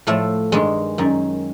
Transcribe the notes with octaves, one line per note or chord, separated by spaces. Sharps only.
A2 F3 A3
G2 D#3 G#3
F#2 D#3